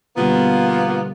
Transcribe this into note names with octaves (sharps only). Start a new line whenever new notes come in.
B2 D3 F3 G3 A#3 B3